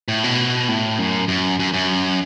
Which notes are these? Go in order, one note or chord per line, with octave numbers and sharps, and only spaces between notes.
A2
B2
A2
F#2
F#2
F#2
F#2